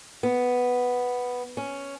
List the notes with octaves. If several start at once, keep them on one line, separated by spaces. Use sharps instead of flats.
B3
C#4